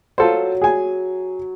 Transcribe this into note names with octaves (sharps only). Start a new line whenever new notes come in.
F#3 F4 A4 C5
G#4 G#5